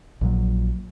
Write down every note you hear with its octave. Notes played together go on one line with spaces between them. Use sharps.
A#1 A#2 F#3